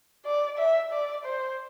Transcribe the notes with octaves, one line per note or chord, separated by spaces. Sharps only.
D5
E5
D5
C5